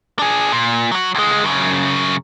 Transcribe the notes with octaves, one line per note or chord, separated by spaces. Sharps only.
D4 G#4
A#2
F#3 F#4
C#2 G#3
F#2 C#3